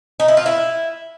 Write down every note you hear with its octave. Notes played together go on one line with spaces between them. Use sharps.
D#4
E4
F4
E4